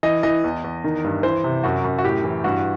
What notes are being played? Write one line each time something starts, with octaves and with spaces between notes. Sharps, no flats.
E3 D#5
E3 D#5
E2
E2
D#3
G2
E3 C5
C3
F#2 F#4
F#2
F#4
A2 G4
E3
G2 F#4